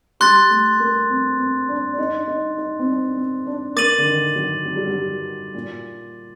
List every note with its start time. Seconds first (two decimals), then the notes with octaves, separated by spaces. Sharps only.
0.20 G3 C6 F#6 A6
0.50 A3
0.80 A#3
1.09 C4
1.39 C4
1.69 D4
1.94 D4
1.98 D#4
2.28 D#4
2.58 D#4
2.79 C4
2.88 D4
3.17 C4
3.47 D4
3.76 A#3 D6 A6 D#7 F#7
3.98 D3
4.06 D#3
4.36 F#3
4.65 F#3
4.76 G3
4.86 F#3
5.54 A#2